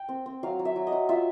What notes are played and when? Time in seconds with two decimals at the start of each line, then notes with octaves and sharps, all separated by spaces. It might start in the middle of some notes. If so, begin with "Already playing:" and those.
Already playing: G5
0.09 C4
0.26 C4
0.43 F#3 F5
0.59 F#3
0.65 E5
0.76 F#3
0.87 D#5
0.92 F#3
1.09 F4 E5